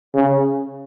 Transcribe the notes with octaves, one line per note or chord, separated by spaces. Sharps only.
C#3